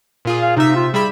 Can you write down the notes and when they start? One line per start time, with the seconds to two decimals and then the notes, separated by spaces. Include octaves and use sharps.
0.25 A#2 F4 G#4
0.42 F5
0.57 C3 D#4 E5
0.76 F4
0.94 G3 G#4 E5 B5